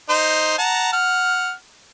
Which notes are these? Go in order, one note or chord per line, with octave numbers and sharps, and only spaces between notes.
D#4 C5 C6
F#5 A5 A#5
F#5 F6